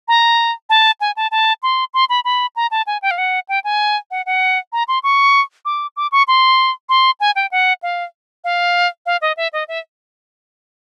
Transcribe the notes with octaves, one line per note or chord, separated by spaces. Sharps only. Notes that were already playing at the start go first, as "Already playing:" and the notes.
A#5
A5
G#5
A5
A5
C6
C6
B5
B5
A#5
A5
G#5
G5
F5
F#5
G5
G#5
F#5
F#5
A#5
C6
C#6
D6
D6
C#6
C6
C6
G#5
G5
F#5
F5
F5
F5
D#5
E5
D#5
E5